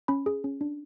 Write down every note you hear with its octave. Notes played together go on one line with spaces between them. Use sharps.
C#4 B5
G#4
C#4
D4